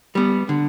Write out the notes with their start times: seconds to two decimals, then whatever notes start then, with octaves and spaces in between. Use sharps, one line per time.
0.15 G3 B3
0.49 D3